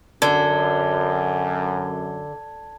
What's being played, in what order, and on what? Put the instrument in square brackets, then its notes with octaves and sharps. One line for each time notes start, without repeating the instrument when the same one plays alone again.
[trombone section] F#2 [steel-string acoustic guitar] D3 [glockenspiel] A5 G#6 G7